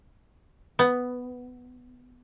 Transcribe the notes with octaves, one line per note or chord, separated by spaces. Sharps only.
B3